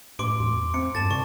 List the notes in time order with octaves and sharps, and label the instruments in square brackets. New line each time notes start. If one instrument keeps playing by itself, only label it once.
[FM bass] A2 [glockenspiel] C6 D6 D7
[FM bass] E2
[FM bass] C4 [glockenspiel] C#7
[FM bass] G2 [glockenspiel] A5 A6
[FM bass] C3 [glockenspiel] C#6